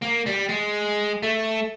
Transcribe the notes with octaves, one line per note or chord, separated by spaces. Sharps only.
A#3
G3
G#3
A3